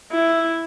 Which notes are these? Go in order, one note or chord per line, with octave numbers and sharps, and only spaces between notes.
E4